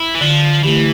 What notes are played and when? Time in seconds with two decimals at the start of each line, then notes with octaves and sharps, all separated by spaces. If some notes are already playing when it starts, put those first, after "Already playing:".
Already playing: E4
0.15 E3
0.21 D3 F3
0.63 E3 A3 E4 G4